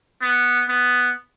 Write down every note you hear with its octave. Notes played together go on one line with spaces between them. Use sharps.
B3
B3